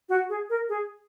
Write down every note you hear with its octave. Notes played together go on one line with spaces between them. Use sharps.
F#4
G#4
A#4
G#4